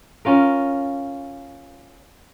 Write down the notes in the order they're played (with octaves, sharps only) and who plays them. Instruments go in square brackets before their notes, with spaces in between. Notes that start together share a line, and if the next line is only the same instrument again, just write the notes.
[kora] C#4 F4 A#4